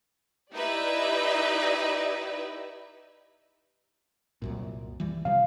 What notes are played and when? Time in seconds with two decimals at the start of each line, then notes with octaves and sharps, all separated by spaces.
0.54 D#4 E4 G4 B4 D5 E5
4.42 C2 F#2 A#2
5.00 E3 G3
5.25 C3 F3 G3 F5